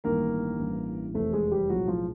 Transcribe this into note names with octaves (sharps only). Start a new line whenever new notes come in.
A1 G2 D#3 A#3 A#4
A1 G2 E3
F1 E2 C3 A3 A4
G#3 G#4
G#4
G3 G4
B1 A2 F3 F#3 G#3 F#4
F3 F4